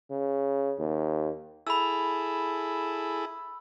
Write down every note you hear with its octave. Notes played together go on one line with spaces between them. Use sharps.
C#3
D#2
E4 G#4 A4 B5 E6